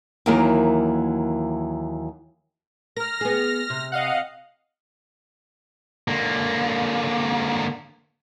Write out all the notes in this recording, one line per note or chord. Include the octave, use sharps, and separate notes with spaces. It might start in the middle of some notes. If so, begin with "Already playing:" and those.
D#2 E3 F#3 A#3 E4 A#4
A#4 F6 A#6
B3 G#4
C3
D#5 F5 F#5
D3 A#3